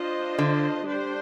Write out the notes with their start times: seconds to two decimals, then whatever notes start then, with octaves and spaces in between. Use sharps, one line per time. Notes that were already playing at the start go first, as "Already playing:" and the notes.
Already playing: D4 F4 C5 D#5
0.38 D3
0.85 G3 D4 G4 C5